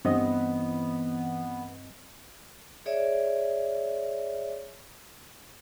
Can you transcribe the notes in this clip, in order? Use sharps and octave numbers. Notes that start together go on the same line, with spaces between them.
G2 E3 B3 C4 D#5
G#4 C#5 D5 E5